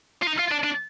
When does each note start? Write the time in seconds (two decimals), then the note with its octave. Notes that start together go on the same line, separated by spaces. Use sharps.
0.22 F4
0.27 D#4
0.39 F4
0.51 D4
0.64 D4